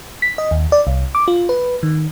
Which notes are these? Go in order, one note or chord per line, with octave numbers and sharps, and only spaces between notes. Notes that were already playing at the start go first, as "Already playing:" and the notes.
B6
D#5
D#2
D5
C2
D6
F4
B4
D#3